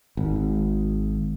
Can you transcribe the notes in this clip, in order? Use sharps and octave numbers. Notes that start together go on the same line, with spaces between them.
G#1